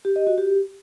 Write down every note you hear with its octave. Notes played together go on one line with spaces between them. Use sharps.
G4
D#5
F#4
G4